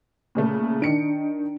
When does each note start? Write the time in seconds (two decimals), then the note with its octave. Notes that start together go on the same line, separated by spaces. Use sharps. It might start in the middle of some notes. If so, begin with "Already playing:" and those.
0.35 A#2 C#3 A3
0.82 D#3 D4 C#7 D7